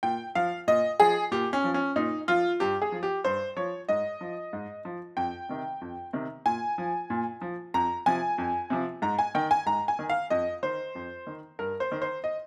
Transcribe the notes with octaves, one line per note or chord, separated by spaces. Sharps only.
A#2 G5
F3 F5
A#2 D#5
F3 G#4
A#2 G4
C#4
F3
C#4
A#2 D#4
F3 F4
G2 G4
G#4
F3
G4
G2 C5
F3 C#5
G#2 D#5
F3
G#2
F3
F2 G5
C3 D#3
F2
C3 D#3
A#2 G#5
F3
A#2
F3
F2 A#5
C3 F3 G#5
F2
C3 F3
G#2 A#5
G#5
D#3 G5
G#5
G#2 A#5
G#5
D#3
F5
F2 D#5
D#3 C5
F2
D#3
G2 A#4
C5
D#3
C5
D#5